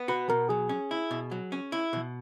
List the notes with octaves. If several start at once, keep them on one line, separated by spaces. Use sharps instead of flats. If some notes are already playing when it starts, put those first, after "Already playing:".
Already playing: B3
F#4 B4
B2 A#4
F#3 G#4
C#4
E4
B2
F#3
C#4
E4
B2